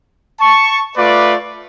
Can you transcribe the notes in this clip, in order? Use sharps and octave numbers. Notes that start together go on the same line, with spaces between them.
A5 C#6
A3 F4 B4 D5